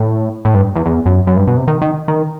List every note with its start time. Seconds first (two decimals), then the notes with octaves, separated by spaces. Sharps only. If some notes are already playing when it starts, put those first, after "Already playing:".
Already playing: A2
0.45 A2
0.54 G2
0.76 E2
0.86 E2
1.06 F#2
1.27 F#2
1.37 G2
1.47 B2
1.57 C3
1.67 D#3
1.82 D#3
2.08 D#3